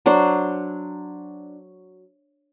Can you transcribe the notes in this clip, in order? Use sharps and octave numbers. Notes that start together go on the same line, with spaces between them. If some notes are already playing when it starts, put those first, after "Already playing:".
F#3 D4 C5